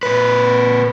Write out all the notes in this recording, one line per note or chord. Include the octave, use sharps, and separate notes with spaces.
A#2 B4